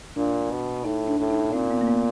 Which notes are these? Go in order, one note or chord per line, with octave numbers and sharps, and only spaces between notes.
A#2 D4
B2
A2 D#4
D4
A2
D#4
A#2 C4
B3
A#3
B3